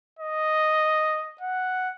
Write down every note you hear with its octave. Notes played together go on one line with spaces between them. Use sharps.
D#5
F#5